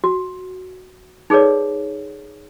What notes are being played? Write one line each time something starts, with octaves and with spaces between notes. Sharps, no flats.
F#4
D#4 G#4 A4 B4 C#5 D5